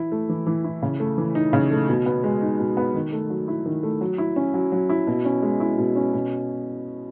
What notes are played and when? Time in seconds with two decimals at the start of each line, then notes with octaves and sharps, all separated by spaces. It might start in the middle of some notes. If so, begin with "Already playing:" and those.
Already playing: E3 E4
0.12 A3
0.29 E3
0.47 E3
0.64 E4
0.82 C#3
1.00 A3
1.18 E3
1.35 D#4
1.53 C#3
1.71 A3
1.89 B2
2.06 B3
2.24 G#3
2.41 D#4
2.59 B2
2.77 B3
2.95 D#3
3.12 A3
3.30 F#3
3.48 E4
3.66 D#3
3.83 A3
4.01 F#3
4.18 E4
4.36 C#4
4.54 F#3
4.72 F#3
4.89 E4
5.07 B2
5.25 C#4
5.42 G#3
5.60 E4
5.78 B2
5.96 C#4
6.13 B2